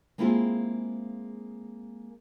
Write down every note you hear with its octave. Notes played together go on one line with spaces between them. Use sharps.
G#3 A#3 C4 E4 F4 G#4